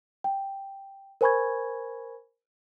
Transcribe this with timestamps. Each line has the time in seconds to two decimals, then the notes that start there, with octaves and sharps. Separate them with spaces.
0.24 G5
1.21 A#4 C5 G#5 B5 C#6 G#6